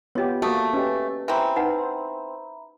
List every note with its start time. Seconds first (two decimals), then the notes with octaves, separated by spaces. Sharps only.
0.15 B3 F4 G4 C#5 D#5
0.42 A3 A#3 F#4 G#4 A5 D#6
0.73 C#4 G4 B4 D#5
1.28 E3 C4 E5 A#5 B5
1.56 D#4 B4 F#5